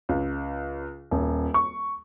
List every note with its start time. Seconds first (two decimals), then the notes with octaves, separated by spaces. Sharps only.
0.09 C#2
1.11 D#1
1.54 C#6